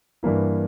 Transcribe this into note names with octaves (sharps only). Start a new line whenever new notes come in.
G2 E3 A#3 E4